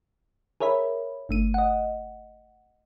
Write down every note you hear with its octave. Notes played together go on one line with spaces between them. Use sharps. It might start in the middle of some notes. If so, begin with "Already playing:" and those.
G#4 A#4 C#5 E5 B5
G1 A3 D#7
D#5 F#5